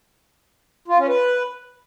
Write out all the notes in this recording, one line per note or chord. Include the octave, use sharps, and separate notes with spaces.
F4
C#4
B4